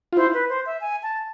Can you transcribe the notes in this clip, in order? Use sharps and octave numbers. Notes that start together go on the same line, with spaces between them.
F4
E4 C5
B4
C5
E5
G#5
A5